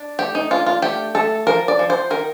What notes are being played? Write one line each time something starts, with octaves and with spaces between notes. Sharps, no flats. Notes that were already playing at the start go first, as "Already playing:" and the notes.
Already playing: D4
A3 G4
D#4
D4 F4
F4
A3 G4
A3 A4
F3 A#4
D5
F3
C5
D#3 A#4